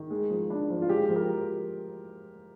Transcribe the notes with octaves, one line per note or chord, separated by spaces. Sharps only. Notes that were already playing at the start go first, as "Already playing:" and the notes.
Already playing: D#3
G#3
F3
D4
F3
F4
G#3 G4
F3
G4 A#4